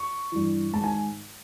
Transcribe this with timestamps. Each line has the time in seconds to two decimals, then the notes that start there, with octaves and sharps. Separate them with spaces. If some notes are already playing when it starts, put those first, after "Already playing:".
Already playing: C#6
0.32 G2 E3
0.73 G#2 D#3 A5
0.84 G#5